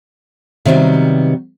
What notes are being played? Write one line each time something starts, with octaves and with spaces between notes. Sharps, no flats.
C3 D#3 F#3 G3 B3